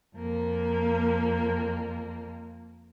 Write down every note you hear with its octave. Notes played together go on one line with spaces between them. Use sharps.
F2 A#3